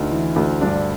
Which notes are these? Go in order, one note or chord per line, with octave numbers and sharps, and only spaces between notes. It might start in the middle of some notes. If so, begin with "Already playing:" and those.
Already playing: D2 D#4
E3
D2
G2 D4